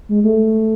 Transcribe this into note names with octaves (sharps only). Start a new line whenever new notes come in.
G#3
A3